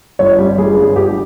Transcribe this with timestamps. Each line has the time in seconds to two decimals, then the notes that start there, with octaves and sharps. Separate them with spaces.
0.19 G1 C#5
0.39 G3
0.58 G1 G#4
0.77 G2
0.96 G1 G4